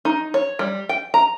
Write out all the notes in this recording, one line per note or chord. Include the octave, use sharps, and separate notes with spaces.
D#4
C#5
G3
G5
A#5